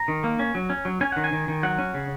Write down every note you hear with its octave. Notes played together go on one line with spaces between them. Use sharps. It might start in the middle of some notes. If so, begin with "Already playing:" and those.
Already playing: A#5
D#3
A#3
C#4
F#3
C#4
F#3
C#4 G#5
D#3 F#5
G#5
D#3
D#3
F#3 F#5
C#4
C#3